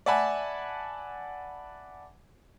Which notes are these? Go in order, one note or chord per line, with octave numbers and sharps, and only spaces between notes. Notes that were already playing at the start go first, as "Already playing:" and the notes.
D5 E5 F#5 G#5 A5 B5